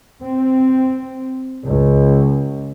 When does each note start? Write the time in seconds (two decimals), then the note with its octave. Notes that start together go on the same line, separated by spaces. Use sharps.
0.22 C4
1.64 C#2